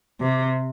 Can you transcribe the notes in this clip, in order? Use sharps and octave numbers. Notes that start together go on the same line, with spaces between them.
C3